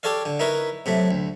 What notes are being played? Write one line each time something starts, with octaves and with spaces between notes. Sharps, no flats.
G4 A4 C#5 D5 F5
D3
D#4 E4 A#4 B4 C#5
C3 F#3 A3
D2